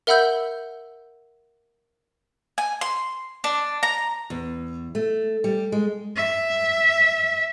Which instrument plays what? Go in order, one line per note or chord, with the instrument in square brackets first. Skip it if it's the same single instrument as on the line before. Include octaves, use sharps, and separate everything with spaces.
[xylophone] A#4 E5 F#5 B5 E6 G6
[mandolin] G#5
C6
D4
A#5
[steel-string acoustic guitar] E2
A3
G3
G#3
[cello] E5